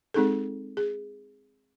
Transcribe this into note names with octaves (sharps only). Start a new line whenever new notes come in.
G#3 C4 D#4 G#4 A4
G#4